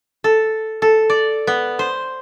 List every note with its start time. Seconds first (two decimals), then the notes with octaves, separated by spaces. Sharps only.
0.24 A4
0.82 A4
1.10 D5
1.47 B3
1.79 C5